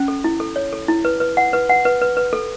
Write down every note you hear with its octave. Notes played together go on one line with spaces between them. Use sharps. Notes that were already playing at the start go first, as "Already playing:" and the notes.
Already playing: C#4
A4
E4
A4
C#5
A4
E4
B4
B4
F#5
B4
F#5
B4
B4
B4
A4